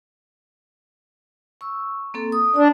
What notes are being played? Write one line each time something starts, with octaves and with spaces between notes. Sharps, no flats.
C#6 E6
A#3 C4 A4
D#6
D4 D5